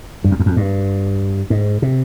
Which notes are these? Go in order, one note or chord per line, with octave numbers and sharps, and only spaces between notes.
G2
F2
E2
F2
G2
G#2
C3